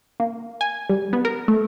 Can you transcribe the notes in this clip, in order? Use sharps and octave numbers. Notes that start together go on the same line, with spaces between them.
A#3
G#5
G3
B3
A#4
A3